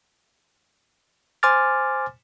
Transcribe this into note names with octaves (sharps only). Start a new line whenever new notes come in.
C5 G#5 C6 D6 F6 A6